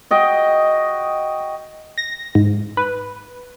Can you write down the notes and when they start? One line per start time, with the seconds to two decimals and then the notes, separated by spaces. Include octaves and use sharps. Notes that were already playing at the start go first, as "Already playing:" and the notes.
0.11 F#4 D#5 G5
1.98 A#6
2.35 G#2
2.77 B4